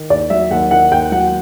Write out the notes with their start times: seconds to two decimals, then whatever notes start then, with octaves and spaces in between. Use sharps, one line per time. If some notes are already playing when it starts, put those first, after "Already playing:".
Already playing: D#3
0.10 D#2 D5
0.30 F#3 E5
0.51 D#2 F#5
0.71 D#3 F#5
0.91 D#2 G5
1.12 F#3 F#5